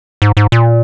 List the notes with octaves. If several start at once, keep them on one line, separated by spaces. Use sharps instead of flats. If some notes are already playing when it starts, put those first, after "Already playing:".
G#2
G#2
A#2